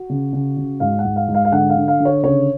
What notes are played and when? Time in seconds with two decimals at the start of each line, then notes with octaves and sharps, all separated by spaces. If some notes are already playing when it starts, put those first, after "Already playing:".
Already playing: F#4
0.10 C#3
0.33 C#3
0.57 C#3
0.80 G#2 F5
0.99 F#5
1.05 G#2
1.16 F5
1.28 G#2
1.35 F5
1.45 F5
1.52 D3 F#5
1.70 F5
1.76 D3
1.88 F5
2.00 D3
2.05 C#5
2.23 C#3 C#5